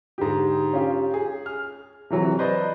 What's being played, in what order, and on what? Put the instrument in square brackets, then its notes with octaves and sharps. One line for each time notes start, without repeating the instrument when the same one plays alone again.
[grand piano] G#2 D3 G4
C#4 F4 G4
G#4
F6
C3 E3 F#3
B4 C5 D5 D#5